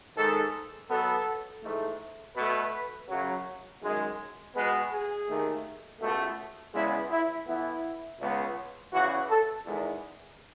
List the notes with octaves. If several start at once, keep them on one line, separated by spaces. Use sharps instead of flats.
G#2 D#3 G#3 A4
B2 F#3 B3 A4
G#2 E3 A3
B2 A3 B4
F#2 C#3 F#3
F#2 D#3 G#3
B2 G#3 B3 B4
G#4
D#2 D#3 A3
C#2 B2 A3
E2 C#3 G#3 B3 E4
E4
A2 E3 B3 E4
C#2 C#3 G#3 B3
E2 C#3 E3 F#4
A4
E2 D#3 G#3